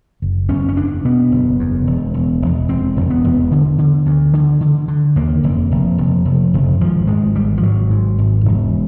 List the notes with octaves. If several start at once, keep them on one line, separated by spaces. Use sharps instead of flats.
F#1
F#1 C#4
C#4
E2 D4
B2 B3
F#1
E2
E1
E1
E1
E1 C4
E1
B3
E1
D3
D3
D2
D3
D3
D3
D#2 A#3
F1
F1
F1
F1
F1
G#1 F3
G#1 G#3
G#1 G3
F3
G#1 F#3
G#2
G#1
E1